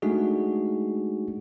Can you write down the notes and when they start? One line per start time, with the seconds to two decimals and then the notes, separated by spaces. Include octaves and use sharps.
0.02 G#3 A3 D4 D#4 F#4 G#4